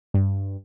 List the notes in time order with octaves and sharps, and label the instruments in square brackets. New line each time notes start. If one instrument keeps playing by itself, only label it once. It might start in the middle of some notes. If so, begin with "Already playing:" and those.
[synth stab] G2